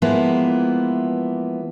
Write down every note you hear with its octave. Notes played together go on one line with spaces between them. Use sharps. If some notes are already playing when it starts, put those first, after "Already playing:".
E3 F3 G#3 A#3 B3 E4